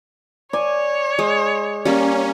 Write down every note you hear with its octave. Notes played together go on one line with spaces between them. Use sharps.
C#5 D5 G#5
G#3
G3 A#3 C#4